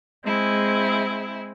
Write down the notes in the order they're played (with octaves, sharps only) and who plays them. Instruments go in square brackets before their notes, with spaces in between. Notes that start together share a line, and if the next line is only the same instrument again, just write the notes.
[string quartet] G#3 C4 E4 G#4